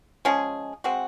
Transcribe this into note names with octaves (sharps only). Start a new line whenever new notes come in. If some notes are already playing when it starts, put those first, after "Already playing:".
F3 G#3 C#4 G#4
G#3 C4 F#4